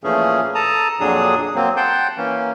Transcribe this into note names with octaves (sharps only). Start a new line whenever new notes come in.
A#2 E3 F3 A3 C#4 G#4
A4 A5 A#5 D#6
F2 A#2 F#3 D4 G#4 D#6
F#3 A#3 C4
F#5 G5 A5 C6 G6
E3 A#3 C#4